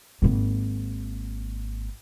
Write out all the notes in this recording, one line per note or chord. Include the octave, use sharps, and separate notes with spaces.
G#1 A#3